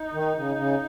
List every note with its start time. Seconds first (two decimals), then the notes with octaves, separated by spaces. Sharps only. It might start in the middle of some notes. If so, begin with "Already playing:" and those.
Already playing: D#4
0.14 D#3
0.35 C#3
0.56 C#3